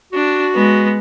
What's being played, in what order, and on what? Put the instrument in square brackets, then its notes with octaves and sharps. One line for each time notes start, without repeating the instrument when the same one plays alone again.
[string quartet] D4 [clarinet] F#4
[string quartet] G#3 B3